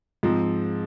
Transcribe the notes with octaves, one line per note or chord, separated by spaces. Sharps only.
G#2 F3 C4